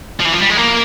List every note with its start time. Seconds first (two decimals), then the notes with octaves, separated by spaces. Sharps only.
0.20 F3
0.25 E3
0.33 F3
0.41 G3
0.50 G#3
0.57 A#3